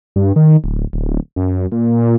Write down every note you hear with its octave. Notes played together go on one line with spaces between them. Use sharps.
G2
D#3
D1
D1
F#2
A#2